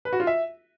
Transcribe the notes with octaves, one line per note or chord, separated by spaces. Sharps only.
B4
F#4
F4
E5